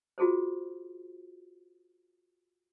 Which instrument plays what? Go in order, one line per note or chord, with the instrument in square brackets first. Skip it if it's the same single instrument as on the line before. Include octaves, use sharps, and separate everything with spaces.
[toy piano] F4 F#4 G#4 A4 C5